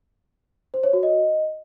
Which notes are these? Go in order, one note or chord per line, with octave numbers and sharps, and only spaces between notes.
C5
C#5
F#4
D#5